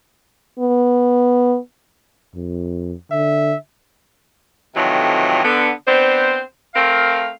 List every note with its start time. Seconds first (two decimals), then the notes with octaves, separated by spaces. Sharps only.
0.59 B3
2.35 F2
3.12 D3 E5
4.75 F2 A2 C3 D#3 E3 F#3
5.43 D3 B3
5.87 B3 C4 D4 C5
6.74 A3 C4 A#4 F5